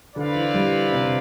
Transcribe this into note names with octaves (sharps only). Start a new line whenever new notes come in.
D3 C4 E4 B4 D5 F5
E3
G3
C3